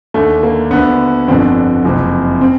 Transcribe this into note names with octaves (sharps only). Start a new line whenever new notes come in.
D#2 D3 A3
A#3
D2 D3 B3
G1 F2 D3 C4
F#1 F2 C3
C4